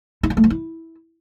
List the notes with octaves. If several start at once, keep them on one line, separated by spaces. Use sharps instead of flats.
E4
F4
A3
F3
E4